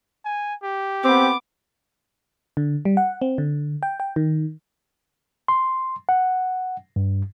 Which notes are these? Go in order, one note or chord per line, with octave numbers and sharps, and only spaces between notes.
G#5
G4
B3 C4 D6
D3
G3
F#5
C4
D3
G5
G5
D#3
C6
F#5
G2